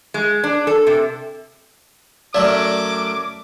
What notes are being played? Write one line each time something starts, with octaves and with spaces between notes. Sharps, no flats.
G#3
D4
A4
C3
F#2 F#3 A3 D5 D6